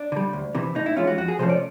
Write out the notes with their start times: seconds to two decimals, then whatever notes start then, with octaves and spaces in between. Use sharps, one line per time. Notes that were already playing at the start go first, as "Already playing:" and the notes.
Already playing: D4
0.12 D3 G3
0.33 D2
0.55 C3 E3
0.75 A2 D#4
0.86 E4
0.96 E3 G#3 C#4 F4
1.07 F#4
1.18 F2 F#4
1.28 G#4
1.39 C3 F3 A3 C#4 C5
1.49 D5